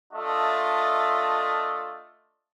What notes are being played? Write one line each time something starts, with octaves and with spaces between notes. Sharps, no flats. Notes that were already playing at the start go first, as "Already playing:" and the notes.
A3 D4 F4 D#5 E5